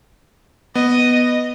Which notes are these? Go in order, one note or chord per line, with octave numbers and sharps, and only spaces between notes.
B3 D#5